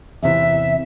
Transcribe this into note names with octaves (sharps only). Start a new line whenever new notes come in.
E2 C3 E3 E5